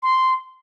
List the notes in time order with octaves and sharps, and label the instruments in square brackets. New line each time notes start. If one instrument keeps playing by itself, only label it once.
[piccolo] C6